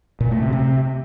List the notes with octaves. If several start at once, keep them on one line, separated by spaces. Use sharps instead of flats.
A#2
A3
C3
C3